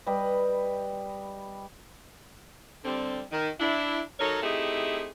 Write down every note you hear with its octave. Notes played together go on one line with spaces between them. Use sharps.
G3 B4 D#5 G5
D3 G3 C4
D#3
D4 E4
F#3 D#4 A4 A#4 C#5
A3 C4 D#4 E4 G4 G#4